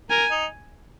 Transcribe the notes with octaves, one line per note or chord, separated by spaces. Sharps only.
A#4 G#5
D#4